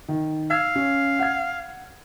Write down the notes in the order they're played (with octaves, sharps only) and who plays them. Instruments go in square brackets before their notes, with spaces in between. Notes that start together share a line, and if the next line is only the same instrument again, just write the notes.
[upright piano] D#3
[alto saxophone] F5 [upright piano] E6 G#6
[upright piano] C#4
F#5 G#6